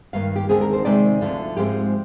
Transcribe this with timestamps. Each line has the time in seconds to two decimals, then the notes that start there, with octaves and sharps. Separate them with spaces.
0.13 G2 D#3 A#3 F5
0.36 G4
0.49 D#2 D3 G#3 C4 G#4
0.61 A#4
0.73 C5
0.85 C3 D#3 G#3 C4 D5
1.21 D2 D3 F3
1.57 G#2 F3 G#3 C4 G4